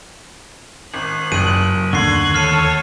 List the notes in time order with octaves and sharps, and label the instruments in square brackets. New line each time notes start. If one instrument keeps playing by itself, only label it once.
[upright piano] G#1 [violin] F#6
[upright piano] F#1 [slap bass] F#2 F#3 [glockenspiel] D#7
[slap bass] D#2 D#3 A3 [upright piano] D3 [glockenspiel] C#6 C7 [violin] F#6 G#6
[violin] A4 C#5 [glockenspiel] F6 C7 D#7